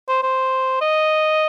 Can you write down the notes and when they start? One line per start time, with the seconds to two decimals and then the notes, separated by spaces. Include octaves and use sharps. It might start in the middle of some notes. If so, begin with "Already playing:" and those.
0.08 C5
0.23 C5
0.81 D#5